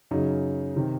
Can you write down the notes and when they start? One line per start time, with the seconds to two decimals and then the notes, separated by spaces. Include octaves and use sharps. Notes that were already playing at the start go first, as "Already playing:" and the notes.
0.11 F#2 C#3 D#4
0.76 C3 D#3